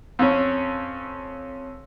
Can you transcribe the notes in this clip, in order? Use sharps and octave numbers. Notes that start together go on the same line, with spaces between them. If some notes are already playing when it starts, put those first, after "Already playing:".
F2 C#4